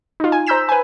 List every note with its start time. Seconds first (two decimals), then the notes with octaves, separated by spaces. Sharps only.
0.20 D#4 F4
0.32 G#5
0.47 C5 A#5 E6 G6 B6 E7
0.69 B4 G#5